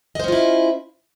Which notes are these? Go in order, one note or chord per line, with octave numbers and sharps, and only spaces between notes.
C#4 E4 F4 C5 D#5